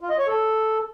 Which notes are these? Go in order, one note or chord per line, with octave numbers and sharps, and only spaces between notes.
F4
D#5
C#5
A4